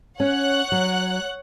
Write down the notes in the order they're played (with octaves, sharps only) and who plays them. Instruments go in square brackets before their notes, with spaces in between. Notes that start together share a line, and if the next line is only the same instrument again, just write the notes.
[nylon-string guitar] C#4 [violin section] C#5 F#5 F#6
[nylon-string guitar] F#3